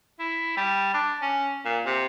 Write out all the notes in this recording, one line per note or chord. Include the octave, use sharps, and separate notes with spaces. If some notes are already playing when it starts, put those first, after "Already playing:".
E4
G3
D4
C#4
A#2
C3